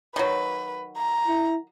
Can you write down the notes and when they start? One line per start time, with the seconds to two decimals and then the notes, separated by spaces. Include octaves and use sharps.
0.16 D#3 F#3 B4
0.97 A#5
1.27 E4